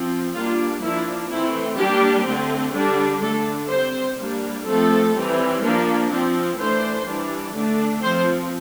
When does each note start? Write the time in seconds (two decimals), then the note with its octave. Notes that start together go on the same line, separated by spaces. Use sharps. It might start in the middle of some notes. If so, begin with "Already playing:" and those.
Already playing: F3 C4
0.35 G3 A#3 D4 F4
0.82 F3 A#3 D4 E4
1.31 E3 A3 C4 E4
1.78 G3 A#3 D4 G4
2.26 D3 A3 C4
2.75 D3 G3 D4
3.22 D3 A3 D4 A4
3.70 G3 C4 C5
4.18 G3 A#3 D4
4.66 F3 A3 C4 A4
5.14 E3 G3 C4
5.63 F3 A#3 D4
6.10 F3 C4
6.58 E3 A3 D4 C5
7.06 E3 G3 D4
7.54 D3 A3 D4
8.02 F3 C4 C5